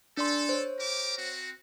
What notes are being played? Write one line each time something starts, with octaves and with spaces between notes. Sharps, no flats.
D4 A4 D5 C6
C5 C#5
G4 A#4 D6
C4 F#4